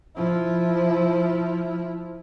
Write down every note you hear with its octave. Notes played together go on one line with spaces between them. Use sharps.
F3 E4